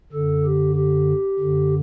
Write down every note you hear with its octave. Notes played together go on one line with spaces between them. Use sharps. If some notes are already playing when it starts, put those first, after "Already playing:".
F#2 D3 A4
G4
G4
F#2 D3